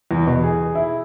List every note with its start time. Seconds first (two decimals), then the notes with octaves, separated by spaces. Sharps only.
0.11 E2
0.27 B2
0.44 G#4
0.75 E4